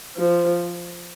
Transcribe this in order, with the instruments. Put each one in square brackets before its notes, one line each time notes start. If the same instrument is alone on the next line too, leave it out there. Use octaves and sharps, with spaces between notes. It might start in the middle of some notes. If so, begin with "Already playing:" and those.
[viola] F3